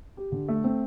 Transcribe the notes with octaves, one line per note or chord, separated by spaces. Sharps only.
G4
D3
A3
C4